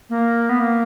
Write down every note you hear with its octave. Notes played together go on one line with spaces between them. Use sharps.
A#3
B3
A#3